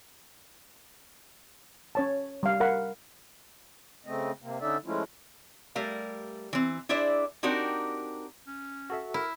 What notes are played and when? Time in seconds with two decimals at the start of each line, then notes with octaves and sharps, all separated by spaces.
1.95 C#4 C#5 A5
2.43 G3 F5
2.60 A#4 F5 F#5 B5
4.06 C#3 A3 C4 D#5
4.42 C3 A#3
4.61 D3 C#4 D#4 A4 D5 E5
4.85 F3 G#3 A3 C#4 E4 F4
5.75 G3 A3 A#4 F5
6.53 E3 C4
6.89 D4 E4 G#4 C5 D5 E5
7.43 C4 D4 D#4 F#4 G4 A#4
8.47 C#4
8.90 F#4 A4 E5
9.14 E4 A#4